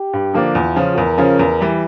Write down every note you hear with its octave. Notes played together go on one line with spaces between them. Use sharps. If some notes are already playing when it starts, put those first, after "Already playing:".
Already playing: G4
G2
D3 F3 A#3 D4
E2 F4
C#3 F3 C#4
E2 A#4
C#3 F3 C#4
E2
E3 G3